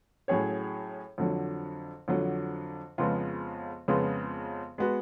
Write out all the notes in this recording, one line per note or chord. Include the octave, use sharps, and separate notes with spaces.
A2 F#3 C#4 G#4 C#5
F2 D3 F#3
F2 D3 F#3
F2 C#3 G#3 B3 F4
F2 C#3 G#3 B3 F4
G#3 B3 F#4